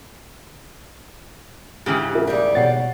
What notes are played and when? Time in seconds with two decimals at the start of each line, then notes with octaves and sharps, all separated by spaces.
1.86 G#2 C#3 E3 G4
2.14 G#4 A#4 E5
2.27 D#2 G3
2.55 B2 C#5 F#5 A6 C7